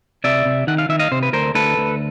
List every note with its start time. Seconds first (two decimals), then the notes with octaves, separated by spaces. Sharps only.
0.24 C3 D5 E5
0.45 C3
0.67 D#3 F#5
0.78 F5
0.89 D#3 E5
0.99 D#5 F5
1.11 C3 C5
1.23 B4
1.33 D2 A#4 C5
1.55 D2 A4 B4
1.78 D2